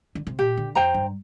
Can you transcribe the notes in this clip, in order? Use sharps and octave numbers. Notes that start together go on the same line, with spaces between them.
D3
C3
A#2 G4
D3
F2 C5 G5 A#5
G2